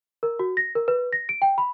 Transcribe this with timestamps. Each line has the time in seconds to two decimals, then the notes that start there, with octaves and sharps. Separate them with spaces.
0.23 A#4
0.39 F#4
0.57 A#6
0.75 A#4
0.88 B4
1.13 A#6
1.29 D7
1.42 G5
1.58 B5